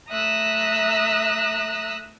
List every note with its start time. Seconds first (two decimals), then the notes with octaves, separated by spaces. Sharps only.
0.11 A3 E5 A#5 D#6 E6 F#6